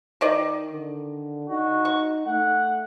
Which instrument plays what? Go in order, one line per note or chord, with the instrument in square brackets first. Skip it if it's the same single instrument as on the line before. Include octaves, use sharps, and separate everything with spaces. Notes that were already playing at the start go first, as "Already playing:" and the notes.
[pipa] D#3 D5 D#5
[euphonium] D3
[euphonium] D#4 [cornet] F#4
[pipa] C#6
[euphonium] A3 [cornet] F#5